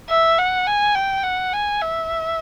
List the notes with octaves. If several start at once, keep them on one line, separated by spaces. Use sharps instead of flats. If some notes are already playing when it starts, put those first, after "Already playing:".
E5
F#5
G#5
G5
F#5
G#5
E5